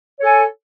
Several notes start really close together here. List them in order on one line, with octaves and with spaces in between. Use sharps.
C#5 A4 G#5